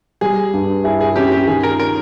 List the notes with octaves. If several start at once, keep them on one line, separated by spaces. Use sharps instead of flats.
G3 G#4
G2
E4 G#4
G#4
C#4 G4
G4
D#3 G#4
A#4
A#4